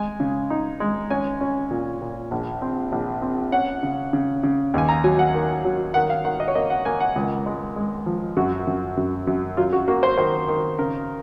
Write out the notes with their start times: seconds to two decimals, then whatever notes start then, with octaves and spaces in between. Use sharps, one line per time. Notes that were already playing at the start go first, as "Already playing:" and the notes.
Already playing: G#3 G#5
0.20 C#3
0.50 D#4
0.80 G#3
1.10 C#4 G#5
1.41 C#4
1.71 A#2
2.02 A#2
2.31 A#1
2.62 C4
2.92 A#1
3.22 C4
3.52 C#4 F#5
3.83 C#3
4.13 C#3
4.43 C#3
4.74 D#2 G#5
4.89 A#5
5.04 F#3 G#5
5.19 F#5
5.34 D#3
5.65 F#3
5.94 D#3 F#5
6.10 F5
6.25 D#3 F#5
6.40 D#5
6.48 C#5
6.55 A#3 D#5
6.70 F#5
6.85 A#3 G#5
7.00 F#5
7.16 C#2
7.46 G#3
7.76 G#3
8.06 F3
8.37 F#2 F#4
8.67 F#2
8.97 F#2
9.27 F#2
9.57 F#3 F4
9.73 F#4
9.88 A#3 F#4
10.03 C5
10.18 D#3 C5
10.48 D#3
10.79 C#3 A#4